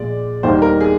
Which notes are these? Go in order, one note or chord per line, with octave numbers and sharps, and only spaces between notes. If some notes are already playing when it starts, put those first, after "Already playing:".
Already playing: A#2 F3 G#3 D5
D#2 D#3 G3 A#3 C5
A#4
G#4